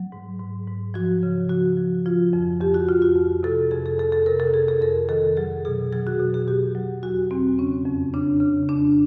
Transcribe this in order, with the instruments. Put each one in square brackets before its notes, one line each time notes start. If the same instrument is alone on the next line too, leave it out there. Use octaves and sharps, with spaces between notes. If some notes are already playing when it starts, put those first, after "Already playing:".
Already playing: [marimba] F#3
G#2
G#2
G#2
F3 F#4
C#3
F3 F#4
F3
F3 F4
F2
F2 G4
F#4
F2 F4
F#4
F2
C3 A4
F2 G#4
A4
F2 A4
A4
C3 A#4
A4
F2 G#4
A4
F2 A#4
D#3 A4
F#3 G#4
B2 G#4
F#3 G#4
F#4
B2
G#4
B2 G4
F#3
E2 F#4
E2 C4
C#3 C#4
F2
C#3 D4
C#3
F2 D4